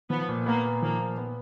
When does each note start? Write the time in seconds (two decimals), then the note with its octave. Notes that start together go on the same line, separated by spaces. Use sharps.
0.10 F3 B3
0.29 A#2
0.46 A#3 B3
0.65 A#2
0.82 F3 A#3
1.00 A#2
1.18 B3